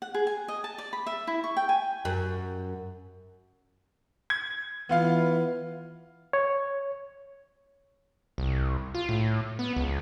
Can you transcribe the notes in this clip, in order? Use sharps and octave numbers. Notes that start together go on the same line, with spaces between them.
F#5
G#4
G#5
D#5
A5
D5
B5
E5
E4
C#6
G5
G#5
F#2
G#6
E3 B3 F4 F5
C#5
C2
F4
A2
B3
C#2